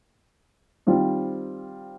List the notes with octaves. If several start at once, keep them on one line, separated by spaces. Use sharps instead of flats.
D#3 G3 C4 F4 C5